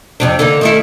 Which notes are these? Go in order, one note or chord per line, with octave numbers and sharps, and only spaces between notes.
F2 C3 D4
D3 A#3 D#4
D#3 A3 E4